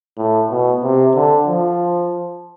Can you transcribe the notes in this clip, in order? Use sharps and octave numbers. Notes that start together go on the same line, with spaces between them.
A2
B2
C3
D3
F3